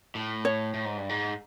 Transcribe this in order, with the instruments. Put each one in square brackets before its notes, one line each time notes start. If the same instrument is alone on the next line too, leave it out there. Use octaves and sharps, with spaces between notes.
[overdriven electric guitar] A2
[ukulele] C#5
[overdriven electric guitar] A2
G#2
G2
G#2